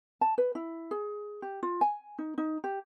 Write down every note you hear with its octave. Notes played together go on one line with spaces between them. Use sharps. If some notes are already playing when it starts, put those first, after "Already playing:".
A5
B4
E4
G#4
G4
F4
G#5
D#4
D#4
G4